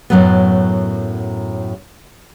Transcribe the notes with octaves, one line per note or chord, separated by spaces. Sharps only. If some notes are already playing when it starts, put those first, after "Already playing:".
F#2 A2 F#3 A3 B3